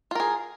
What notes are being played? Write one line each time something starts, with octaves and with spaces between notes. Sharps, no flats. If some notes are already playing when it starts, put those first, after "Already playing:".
F4 G#4 A#4